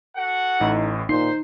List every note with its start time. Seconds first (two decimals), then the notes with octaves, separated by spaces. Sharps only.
0.15 F#4 A4 F#5
0.60 A1 A2 D#4
1.09 A#2 D#4 C5 C6 C7